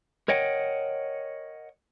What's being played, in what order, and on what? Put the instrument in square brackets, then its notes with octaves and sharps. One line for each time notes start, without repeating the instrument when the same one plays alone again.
[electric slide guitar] A#4 C#5 D#5 F#5 G5